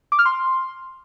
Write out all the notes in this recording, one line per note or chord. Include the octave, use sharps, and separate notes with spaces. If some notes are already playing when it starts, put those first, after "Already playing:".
D6
F6
C6